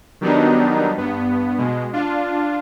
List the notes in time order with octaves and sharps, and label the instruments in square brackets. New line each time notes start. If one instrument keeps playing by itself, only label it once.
[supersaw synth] D#3 F#3 G3 B3 D4 D#4
G2 B3
B2 G#3
D4 F4